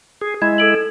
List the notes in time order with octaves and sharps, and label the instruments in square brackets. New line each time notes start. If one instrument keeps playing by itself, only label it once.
[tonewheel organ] G#4
[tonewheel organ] G#3 E4 [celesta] G#6
[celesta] A4 D7 F#7
A4